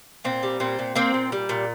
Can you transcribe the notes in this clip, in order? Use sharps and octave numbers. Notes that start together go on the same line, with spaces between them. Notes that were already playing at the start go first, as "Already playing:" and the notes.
A#2 C4
G3
A#2 C4
A#2
A#3 C4
A#2
G3
A#2